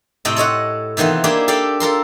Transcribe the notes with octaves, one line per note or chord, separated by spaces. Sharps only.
A2 C3 C4 A4 D#5 G5
A4 C#5 D#5 F#5
C3 D#3 E3 B3 F4
A#3 D4 E4 G4 G#4 G5
G4 A4 D5 F5 G5
F4 A4 A#4 C6